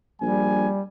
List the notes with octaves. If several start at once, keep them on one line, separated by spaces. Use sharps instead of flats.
A#1 G3 G#5